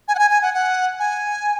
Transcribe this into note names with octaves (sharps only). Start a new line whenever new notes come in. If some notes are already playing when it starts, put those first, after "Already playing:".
G#5
F#5
G#5
G#5
F#5
F#5
G#5